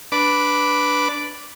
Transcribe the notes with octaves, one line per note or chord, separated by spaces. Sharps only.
D4 B4 D6